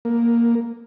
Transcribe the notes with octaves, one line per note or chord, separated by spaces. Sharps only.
A#3